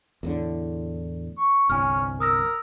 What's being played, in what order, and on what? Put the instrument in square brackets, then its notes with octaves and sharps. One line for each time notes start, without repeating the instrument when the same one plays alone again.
[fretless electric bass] E2 A2 D3
[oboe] C#6
[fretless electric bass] G1 C2 [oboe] C#4 [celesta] G#5 F6
[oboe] A#4 [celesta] D#6 E6 A#6